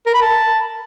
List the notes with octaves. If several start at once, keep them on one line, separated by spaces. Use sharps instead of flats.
A#4
B5
A5